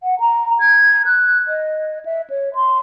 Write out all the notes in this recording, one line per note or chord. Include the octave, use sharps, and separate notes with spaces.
F#5
A#5
G#6
F#6
D#5
E5
C#5
C6